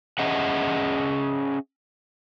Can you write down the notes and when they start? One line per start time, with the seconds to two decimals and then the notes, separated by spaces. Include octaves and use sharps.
0.19 C#4 G#4 D#5 E5 F#5